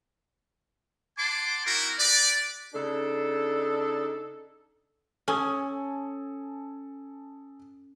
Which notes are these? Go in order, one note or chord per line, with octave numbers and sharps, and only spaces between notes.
F#5 G#5 A5 C6 D6
C4 D#4 E4 F#4 A#4
G4 B4 D5
C#3 D4 D#4 A4
C#4 A4 G#5 D#6